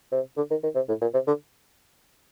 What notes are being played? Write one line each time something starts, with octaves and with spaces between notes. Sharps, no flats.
C3
D3
D#3
D#3
C3
A2
A#2
C3
D3